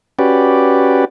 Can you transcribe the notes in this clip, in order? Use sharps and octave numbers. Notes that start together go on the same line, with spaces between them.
C#4 F#4 G4 B4 D5